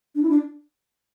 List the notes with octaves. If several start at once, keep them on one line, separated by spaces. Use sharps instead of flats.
D4
E4
D4